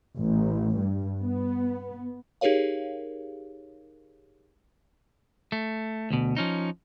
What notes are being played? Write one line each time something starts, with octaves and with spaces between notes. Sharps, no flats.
A1
G2
B3
D#4 G4 G#4 A#4 C#5 F5
A3
D2 B2
F3 C#4 D#4